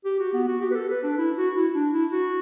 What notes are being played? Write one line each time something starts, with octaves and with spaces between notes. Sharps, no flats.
G4
F#4
B3
F#4
G4
B4
A4
B4
D4
E4
F#4
E4
D4
E4
F#4